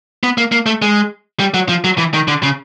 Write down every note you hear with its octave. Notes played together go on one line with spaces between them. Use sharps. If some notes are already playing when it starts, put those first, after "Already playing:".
B3
A#3
A#3
A3
G#3
G3
F#3
F3
F#3
E3
D#3
D3
C#3